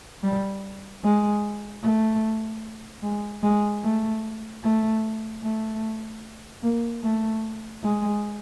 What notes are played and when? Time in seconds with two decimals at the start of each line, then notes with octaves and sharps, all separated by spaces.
0.23 G3
1.03 G#3
1.83 A3
3.03 G#3
3.43 G#3
3.83 A3
4.63 A3
5.43 A3
6.63 A#3
7.03 A3
7.83 G#3